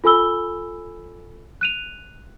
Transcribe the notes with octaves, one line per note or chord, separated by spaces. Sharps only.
F4 A4 G#5 B5 E6 G7
F#6 D#7 F7